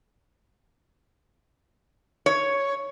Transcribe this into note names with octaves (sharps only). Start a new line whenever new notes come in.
C#5